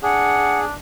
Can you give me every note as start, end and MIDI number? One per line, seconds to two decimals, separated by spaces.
0.03 0.75 62
0.03 0.65 68
0.03 0.60 78